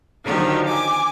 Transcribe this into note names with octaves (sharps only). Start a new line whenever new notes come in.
D3 D#3 F3 F#3 G4
G#5 D6